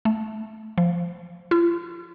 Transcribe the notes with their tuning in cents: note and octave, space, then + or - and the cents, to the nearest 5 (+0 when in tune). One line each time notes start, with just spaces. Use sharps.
A3 -10
F3 -10
F4 -40